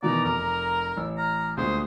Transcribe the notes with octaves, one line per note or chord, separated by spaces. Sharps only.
B2 D#3 E3 D5 A#5
F1 A#4 D6
A1 E6
A#5 F6
D2 A#2 G#3 C5 D#6